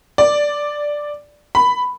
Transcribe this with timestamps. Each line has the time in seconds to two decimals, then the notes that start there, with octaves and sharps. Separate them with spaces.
0.18 D5
1.55 B5